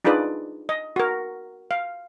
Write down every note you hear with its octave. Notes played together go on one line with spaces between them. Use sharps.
D4 D#4 F4 G#4 B4 D5
D#5
F#4 A#4
F5